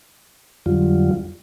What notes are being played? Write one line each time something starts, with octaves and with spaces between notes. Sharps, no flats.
F2 D3 F#3 G3 F4